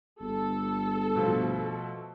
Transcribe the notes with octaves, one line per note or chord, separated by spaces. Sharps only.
G1 A4
B2 F3 A3